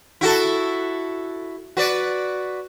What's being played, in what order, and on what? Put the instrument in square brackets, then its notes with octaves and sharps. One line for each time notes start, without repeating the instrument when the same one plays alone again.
[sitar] E4 F#4 A4
F#4 B4 D5